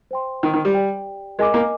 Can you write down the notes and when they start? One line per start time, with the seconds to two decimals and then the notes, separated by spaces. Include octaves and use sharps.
0.11 C5 G5 C6
0.43 D#3
0.54 D#3
0.65 G3
0.74 G4 D5 G5
1.39 G#3 A#4 D#5 G#5 D6
1.54 A#3